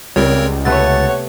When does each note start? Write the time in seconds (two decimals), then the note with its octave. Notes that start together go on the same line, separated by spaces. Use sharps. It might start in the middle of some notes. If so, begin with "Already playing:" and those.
0.16 C#2 G3 C4 A#4 C#5
0.65 C3 A3 B3 C#5 F#5 A6